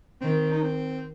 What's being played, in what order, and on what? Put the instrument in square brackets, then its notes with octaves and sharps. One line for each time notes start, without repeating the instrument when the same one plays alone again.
[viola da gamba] D#3 [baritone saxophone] C4
[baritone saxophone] D#4
C4